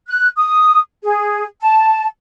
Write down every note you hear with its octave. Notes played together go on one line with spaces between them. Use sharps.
F#6
D#6
G#4
A5